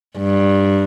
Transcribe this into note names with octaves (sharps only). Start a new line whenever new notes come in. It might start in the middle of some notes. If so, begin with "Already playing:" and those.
G2